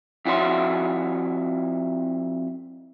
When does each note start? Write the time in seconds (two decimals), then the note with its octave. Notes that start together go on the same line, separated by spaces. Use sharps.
0.25 F2 E4 F#4 C#5 C6